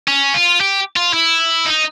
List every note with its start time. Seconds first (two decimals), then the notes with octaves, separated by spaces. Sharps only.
0.08 C#4
0.34 F4
0.60 G4
0.96 F4
1.13 E4
1.66 D#4